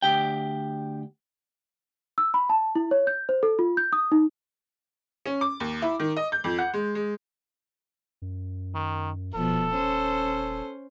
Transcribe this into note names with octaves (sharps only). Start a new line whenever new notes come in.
D2 G4 G5
E6
B5
A5
E4
C#5
G6
C5
A4
F4
G6
D#6
D#4
C#4
D6
D#2
E4
D#3
D#5
G6
F2
F#5
G#3
G#3
F#2
D#3
D#1 B2 F3 A4
C#4 C5